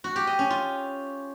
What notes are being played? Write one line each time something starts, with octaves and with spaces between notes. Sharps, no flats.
F#4
G4
D#5
C#4
F4